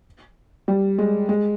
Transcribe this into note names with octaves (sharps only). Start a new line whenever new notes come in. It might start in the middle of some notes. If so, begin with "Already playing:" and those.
G3
G#3
G#3